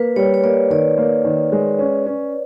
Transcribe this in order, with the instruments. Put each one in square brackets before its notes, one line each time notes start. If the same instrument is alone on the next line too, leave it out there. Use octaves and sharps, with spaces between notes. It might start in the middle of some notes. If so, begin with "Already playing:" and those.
Already playing: [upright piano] A#3 [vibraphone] B4
[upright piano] G3 [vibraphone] C#5
[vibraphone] C#5
[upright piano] A#3 [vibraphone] D5
[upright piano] D#3 [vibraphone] D5
[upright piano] A#3
D#3
G#3
C#4
C#4